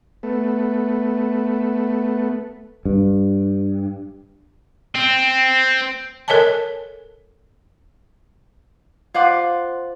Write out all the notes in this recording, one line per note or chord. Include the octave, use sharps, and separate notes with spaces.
A3 B3
G2
C4
A4 A#4 C#5 D#5 G#5 A5
F4 C5 F#5 D6